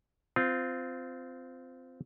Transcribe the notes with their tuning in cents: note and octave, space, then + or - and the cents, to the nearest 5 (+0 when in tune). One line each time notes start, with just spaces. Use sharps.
C4 -20 F4 +0